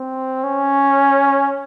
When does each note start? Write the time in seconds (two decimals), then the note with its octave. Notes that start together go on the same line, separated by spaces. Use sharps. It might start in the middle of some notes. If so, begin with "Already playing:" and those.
Already playing: C4
0.44 C#4